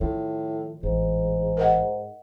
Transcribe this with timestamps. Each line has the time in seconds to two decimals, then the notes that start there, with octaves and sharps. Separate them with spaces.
0.01 A2 D#3 F3
0.83 A1 G#2 E3
1.57 A#4 D#5 F#5